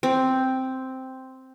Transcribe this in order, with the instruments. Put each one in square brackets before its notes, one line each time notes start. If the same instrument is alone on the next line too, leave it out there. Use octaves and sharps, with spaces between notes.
[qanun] C4